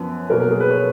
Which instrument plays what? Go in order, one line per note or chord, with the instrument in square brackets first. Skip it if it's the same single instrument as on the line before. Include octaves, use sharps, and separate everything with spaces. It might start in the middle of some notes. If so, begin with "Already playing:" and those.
Already playing: [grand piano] F#2 F3 B3
B2 F#3 A#3 A#4
A#4
G#4
B4
C#5